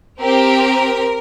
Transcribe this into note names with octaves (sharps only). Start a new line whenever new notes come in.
C4 G4 A#4